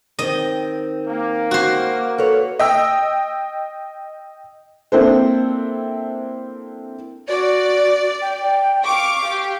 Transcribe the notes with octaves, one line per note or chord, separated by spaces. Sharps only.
D#3 C4 D#5
A#3
F#4 C5
A4 B4 C#5
D#5 G5 E6
A#3 C4 D4 E4 A4 C5
F#4 D5
G5
F5 C#6 D6
G4 F5